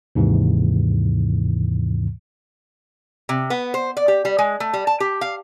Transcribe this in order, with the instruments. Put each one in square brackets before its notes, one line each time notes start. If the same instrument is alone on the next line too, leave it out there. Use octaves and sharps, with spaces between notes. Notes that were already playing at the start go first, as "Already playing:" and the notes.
[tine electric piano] D#2 G#2 C3 E3
[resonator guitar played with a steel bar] C3
B3
C5
D5
G4
G3
G#3
A3
G3
A5
G4
F5